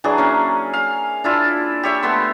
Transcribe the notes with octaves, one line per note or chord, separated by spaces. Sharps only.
E3 F#3 D4 G#4
A#3 C#4
F5
D4 E4 F4
G4 C#5 E5
A3 B3 C6